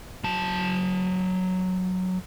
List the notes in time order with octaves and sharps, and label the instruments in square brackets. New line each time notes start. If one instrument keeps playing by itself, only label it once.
[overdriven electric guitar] F#3 A5